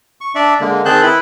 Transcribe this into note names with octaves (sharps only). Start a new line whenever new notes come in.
C#6
D4 D5 E5
D3 G#3 A#3
D#3 C4 G#4 A5 F#6 G6
E4 B4 B5